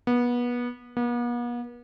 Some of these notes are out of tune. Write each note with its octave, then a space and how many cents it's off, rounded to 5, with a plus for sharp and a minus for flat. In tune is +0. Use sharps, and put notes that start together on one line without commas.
B3 -25
B3 -45